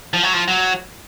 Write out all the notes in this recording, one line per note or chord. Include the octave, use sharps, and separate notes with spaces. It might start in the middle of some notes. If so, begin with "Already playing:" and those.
F3
F#3
F3
F#3